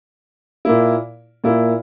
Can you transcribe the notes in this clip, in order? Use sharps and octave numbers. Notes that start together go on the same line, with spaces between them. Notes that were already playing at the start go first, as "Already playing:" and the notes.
A#2 A#3 E4
A#2 A#3 E4